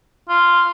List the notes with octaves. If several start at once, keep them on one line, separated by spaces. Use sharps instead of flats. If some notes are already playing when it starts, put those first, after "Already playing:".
F4